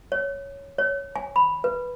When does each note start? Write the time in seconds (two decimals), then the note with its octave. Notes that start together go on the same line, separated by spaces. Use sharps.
0.12 C#5
0.78 C#5
1.16 G#5
1.36 B5
1.64 B4